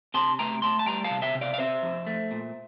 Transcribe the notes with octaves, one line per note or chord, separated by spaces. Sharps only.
C3 A5 C6
A3 G5 A#5
A3 A5 C6
A5
G3 G5 A#5
F5 A5
C3
E5 G5
C3
D5 F5
F5
C4 C5 E5
F2
A3
A#2